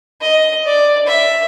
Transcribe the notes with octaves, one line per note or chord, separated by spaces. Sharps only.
D#5
D5
E5